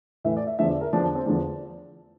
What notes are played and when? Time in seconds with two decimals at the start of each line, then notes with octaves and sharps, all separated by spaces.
0.24 A2 E3 E5
0.37 D5
0.47 E5
0.59 E2 D3 F3 E5
0.70 D5
0.81 A#4
0.93 E2 D3 F3 D4
1.04 D4
1.15 C4
1.26 E2 D3 F3 D4